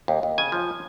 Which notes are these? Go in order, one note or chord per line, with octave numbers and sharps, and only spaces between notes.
D#2
D#2
C#3 G#5
F3